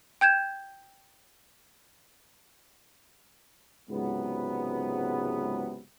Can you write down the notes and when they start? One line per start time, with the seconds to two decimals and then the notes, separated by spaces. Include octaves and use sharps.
0.21 G5 G6 G#6 E7
3.89 C#2 G#2 C3 F#3 B3